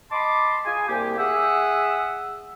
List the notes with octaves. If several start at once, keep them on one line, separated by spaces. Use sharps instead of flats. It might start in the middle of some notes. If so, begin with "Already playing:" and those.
D#5 A5 B5 C6 D6
F4 G#4 G#5
C2 A#3 G4
G#4 E5 F#5 E6